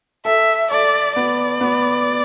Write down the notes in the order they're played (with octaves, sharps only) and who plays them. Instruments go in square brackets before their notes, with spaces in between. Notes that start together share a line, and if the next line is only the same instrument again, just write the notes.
[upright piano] A4 [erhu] E5
[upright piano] A4 [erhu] D5
[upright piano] B3 [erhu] D5
[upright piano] B3